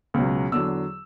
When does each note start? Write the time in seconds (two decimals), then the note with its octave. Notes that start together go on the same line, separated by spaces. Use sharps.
0.14 C#2 B2 F#3
0.52 E2 D3 F#3 E6